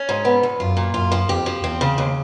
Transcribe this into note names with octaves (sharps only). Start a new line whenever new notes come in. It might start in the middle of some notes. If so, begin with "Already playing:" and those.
Already playing: C#4
G#2
B3
E2
F#2 F4
A#2
F#2 F4
F3
F2 G4
F3
E2 C4
C#3
D#2